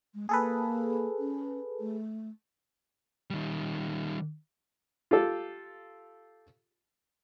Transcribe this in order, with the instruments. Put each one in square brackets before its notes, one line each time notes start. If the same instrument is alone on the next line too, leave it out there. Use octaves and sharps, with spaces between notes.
[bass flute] G#3
[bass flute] A#3 [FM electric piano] G#4 A4 B4
[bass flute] C#4
A3
[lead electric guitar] D#3 G3
[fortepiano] F4 G4 A4